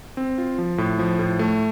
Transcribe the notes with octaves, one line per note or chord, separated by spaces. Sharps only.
C4
F4
F3
A2
F3
A2
A3